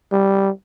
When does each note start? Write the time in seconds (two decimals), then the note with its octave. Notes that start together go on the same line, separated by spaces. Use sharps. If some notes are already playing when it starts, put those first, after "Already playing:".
0.12 G3